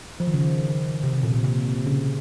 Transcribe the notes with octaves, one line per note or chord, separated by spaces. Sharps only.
F3
D#3
C#3
D#3
C3
C3
A#2
A#2
C3
C#3